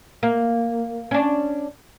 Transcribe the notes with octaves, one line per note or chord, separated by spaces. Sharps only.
A#3
C#4 D4